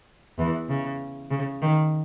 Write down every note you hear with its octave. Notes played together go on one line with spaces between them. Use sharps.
E2 E3
C#3
C#3
D#3